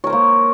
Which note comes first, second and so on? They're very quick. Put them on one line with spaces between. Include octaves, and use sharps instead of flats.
C#5 A#4 C5 A#3